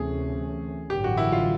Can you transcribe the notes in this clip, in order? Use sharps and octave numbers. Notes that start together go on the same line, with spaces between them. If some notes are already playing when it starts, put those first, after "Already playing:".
Already playing: D2 C3 E3 A3 C#4 G#4
A1 G2 D3 F#3 G4
F#4
E4
F4